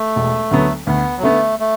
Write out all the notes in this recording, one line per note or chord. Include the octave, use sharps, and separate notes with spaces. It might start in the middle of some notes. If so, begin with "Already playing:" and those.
Already playing: A3
E1
D2 D3 F#3 B3
D2 B3
F#3
D3 A3 B3
A3